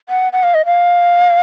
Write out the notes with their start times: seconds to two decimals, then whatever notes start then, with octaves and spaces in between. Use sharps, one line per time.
0.09 F#5
0.33 F#5
0.43 F5
0.54 D#5
0.66 F5